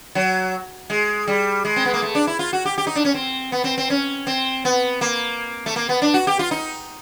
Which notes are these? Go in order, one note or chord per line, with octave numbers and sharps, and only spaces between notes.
F#3
G#3
G3
G#3
C4
B3
A#3
A3
D4
E4
F4
F#4
G4
G4
D#4
D4
C#4
C4
B3
C4
C4
C#4
C4
B3
A#3
A3
A#3
B3
D4
F#4
G4
F4
D#4